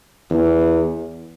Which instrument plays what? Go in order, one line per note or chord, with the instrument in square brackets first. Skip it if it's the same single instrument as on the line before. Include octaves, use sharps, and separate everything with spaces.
[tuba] E2